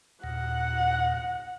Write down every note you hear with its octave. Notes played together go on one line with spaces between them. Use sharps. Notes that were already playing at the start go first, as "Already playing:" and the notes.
D#2 A#2 F#5